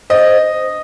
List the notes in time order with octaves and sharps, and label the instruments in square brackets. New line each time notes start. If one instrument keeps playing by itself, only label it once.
[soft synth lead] C5 [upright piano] D#5